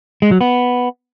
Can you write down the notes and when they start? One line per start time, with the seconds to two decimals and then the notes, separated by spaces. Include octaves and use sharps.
0.22 G#3
0.31 F#3
0.41 B3